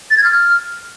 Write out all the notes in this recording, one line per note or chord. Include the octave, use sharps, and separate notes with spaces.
A6
G#6
F6